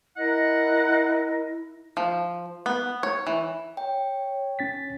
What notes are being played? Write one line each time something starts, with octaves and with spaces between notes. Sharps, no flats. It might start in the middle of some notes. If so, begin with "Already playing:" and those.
E4 A#4 D#5 F#5
F3
B3
C#5
E3
C#5 G5
C#4 A6 B6